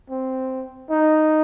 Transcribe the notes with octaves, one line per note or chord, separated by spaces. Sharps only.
C4
D#4